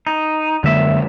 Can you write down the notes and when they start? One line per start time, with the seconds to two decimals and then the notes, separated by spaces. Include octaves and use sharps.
0.07 D#4
0.64 F#2 D3 G#3 A#3 E5